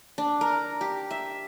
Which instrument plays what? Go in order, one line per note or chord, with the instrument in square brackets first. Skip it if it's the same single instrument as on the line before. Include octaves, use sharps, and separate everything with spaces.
[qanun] D4
A#4
G4
E5